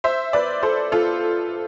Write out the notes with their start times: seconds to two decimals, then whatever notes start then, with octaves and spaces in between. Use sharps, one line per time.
0.04 C5 E5
0.33 B4 D5
0.63 A4 C5
0.92 F4 A4